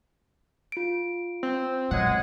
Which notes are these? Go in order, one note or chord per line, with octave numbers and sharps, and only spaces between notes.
F4 D7
C4
B2 F#3 G#3 G#4 F#5